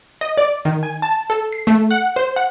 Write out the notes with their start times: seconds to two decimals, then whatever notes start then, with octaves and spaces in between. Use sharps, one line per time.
0.21 D#5
0.38 D5
0.65 D#3
0.83 G#5
1.02 A5
1.30 A4
1.52 C7
1.67 A3
1.91 F#5
2.16 C5
2.36 F#5